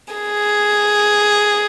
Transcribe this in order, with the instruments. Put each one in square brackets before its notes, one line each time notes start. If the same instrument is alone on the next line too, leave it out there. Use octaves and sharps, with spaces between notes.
[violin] G#4